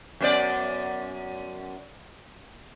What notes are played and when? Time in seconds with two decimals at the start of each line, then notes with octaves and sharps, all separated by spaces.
0.21 F#2 B3 D5